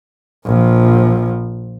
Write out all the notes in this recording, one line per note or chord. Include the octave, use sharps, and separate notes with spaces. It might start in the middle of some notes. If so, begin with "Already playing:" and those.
A#1 F3